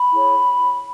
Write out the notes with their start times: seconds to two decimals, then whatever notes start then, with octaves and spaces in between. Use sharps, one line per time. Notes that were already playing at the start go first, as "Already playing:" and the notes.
Already playing: B5
0.11 E4 G#4 C#5